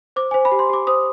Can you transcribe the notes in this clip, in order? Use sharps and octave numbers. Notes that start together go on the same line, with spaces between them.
C5 D6
C5 G#5
B5
G4
C6
G4 D6
C5 D#6